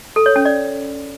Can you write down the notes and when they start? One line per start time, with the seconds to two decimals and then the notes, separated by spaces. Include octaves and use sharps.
0.16 A4
0.26 C#5
0.36 C#4
0.45 D5